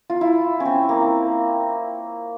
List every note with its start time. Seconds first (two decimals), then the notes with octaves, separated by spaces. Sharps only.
0.10 F4
0.21 E4
0.60 C#4
0.65 C4
0.89 A#3